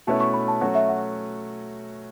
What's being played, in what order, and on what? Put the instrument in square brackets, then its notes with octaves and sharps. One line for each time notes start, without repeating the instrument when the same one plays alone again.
[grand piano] B2 A3 C#4 E4 B4 [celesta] A5
[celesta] C#6
B5
A5
[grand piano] F#3 A3 C#4 F#4 [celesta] F#5
[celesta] E5
F#5